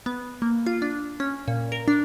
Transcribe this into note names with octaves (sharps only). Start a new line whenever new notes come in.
B3
A#3
F4
D4
C#4
A#2
A#4
D4